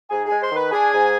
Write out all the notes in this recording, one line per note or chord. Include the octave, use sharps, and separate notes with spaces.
G#2 G#4 G#5
G#4 G#5
G#3
C5 C6
D#3
B4 B5
D4 G#4 G#5
G#2